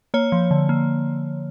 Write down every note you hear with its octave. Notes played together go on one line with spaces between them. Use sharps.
A#3 C#5
F3
D3
A#3